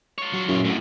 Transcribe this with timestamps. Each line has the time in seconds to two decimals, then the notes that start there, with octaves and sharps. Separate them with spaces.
0.18 F4 C#5
0.33 F#3
0.48 F#2 A#2 C#4 E4
0.65 F2 A2 A3 E4 F#4